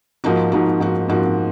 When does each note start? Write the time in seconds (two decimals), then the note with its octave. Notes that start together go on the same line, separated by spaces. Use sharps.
0.24 G#2 F3 A#3 D#4 F#4
0.52 G#2 F3 A#3 D#4 F#4
0.80 G#2 F3 A#3 D#4 F#4
1.08 G#2 F3 A#3 D#4 F#4